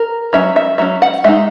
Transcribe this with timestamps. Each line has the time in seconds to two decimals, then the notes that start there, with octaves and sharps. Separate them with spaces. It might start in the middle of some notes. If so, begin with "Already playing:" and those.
Already playing: A#4
0.33 F#3 C#4 E5
0.56 E5
0.78 F#3 C#4 E5
1.02 F#5
1.24 G#3 D#4 E5